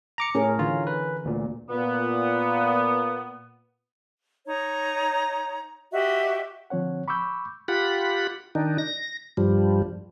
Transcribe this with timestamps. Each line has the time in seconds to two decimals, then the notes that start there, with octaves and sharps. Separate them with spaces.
0.18 A#5 D6 C#7
0.35 A2 C#4 G#4 A#4
0.59 D3 E3 F4
0.87 B4
1.25 D2 A#2
1.70 A#2 B3
4.46 D#4 C#5 A#5
5.92 F#4 G4 D#5 E5
6.70 D3 F3 C4 C#5 F#5
7.08 B5 C#6 D6 E6 G6
7.68 F4 G4 F#5 B5
8.55 D#3 D4 D#4
8.78 A#6
9.37 G2 F3 G3